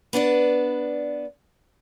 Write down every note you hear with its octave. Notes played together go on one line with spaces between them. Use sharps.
B3 D4 B4 D5